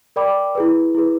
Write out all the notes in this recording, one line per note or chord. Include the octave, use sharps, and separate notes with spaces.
A#4 D5 G5 B5 D6
E4 G#4 B4
E4 G#4 B4